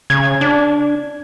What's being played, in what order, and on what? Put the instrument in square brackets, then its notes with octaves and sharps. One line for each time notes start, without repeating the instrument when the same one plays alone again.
[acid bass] C#3 [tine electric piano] G#6
[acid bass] D4